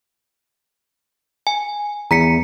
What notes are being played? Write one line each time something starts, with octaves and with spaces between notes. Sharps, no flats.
G#5
E2 A#5 B6 C#7